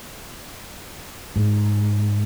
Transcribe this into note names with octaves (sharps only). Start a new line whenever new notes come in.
G#2